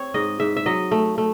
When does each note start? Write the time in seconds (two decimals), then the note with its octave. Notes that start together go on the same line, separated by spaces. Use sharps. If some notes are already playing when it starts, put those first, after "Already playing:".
Already playing: C4 C#5
0.14 G#2 D#5
0.40 G#2 E5
0.57 E5
0.66 F#3 D#5
0.92 A3
1.18 A3